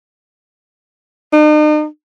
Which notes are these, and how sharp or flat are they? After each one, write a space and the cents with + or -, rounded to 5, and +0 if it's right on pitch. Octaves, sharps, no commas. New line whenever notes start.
D#4 -45